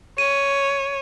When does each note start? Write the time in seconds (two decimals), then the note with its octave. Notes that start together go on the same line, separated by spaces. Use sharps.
0.18 C#5 D#7